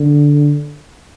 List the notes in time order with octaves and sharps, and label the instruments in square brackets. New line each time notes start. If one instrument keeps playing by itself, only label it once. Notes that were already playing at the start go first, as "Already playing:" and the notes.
Already playing: [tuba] D3